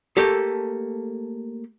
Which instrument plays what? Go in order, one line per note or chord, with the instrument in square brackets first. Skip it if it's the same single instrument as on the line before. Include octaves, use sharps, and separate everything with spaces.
[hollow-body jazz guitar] A3 A#3 G4 A4